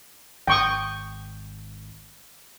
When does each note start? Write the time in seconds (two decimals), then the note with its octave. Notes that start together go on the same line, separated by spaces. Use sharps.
0.47 G#1 G5 C#6 D#6